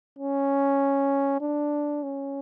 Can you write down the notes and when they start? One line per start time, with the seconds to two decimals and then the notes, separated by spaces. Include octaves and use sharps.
0.19 C#4
1.41 D4
2.03 C#4